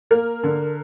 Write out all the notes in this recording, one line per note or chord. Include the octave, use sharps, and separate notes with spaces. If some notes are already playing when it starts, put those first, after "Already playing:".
A#3 A#4
D3